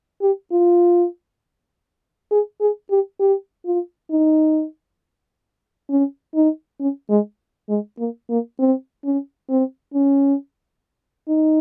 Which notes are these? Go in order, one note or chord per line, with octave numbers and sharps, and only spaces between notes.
G4
F4
G#4
G#4
G4
G4
F4
D#4
C#4
D#4
C#4
G#3
G#3
A#3
A#3
C4
C#4
C4
C#4
D#4